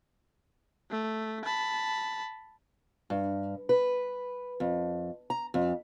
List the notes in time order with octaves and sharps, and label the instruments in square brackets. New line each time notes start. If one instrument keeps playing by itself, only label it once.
[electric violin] A3
A5 B5
[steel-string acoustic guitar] G2
B4
F2
A#5
F2